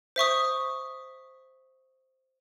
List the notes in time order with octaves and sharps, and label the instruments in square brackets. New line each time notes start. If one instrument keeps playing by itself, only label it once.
[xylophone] C5 E5 C#6 D#6